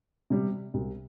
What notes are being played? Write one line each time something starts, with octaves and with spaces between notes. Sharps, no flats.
C3 G3
C2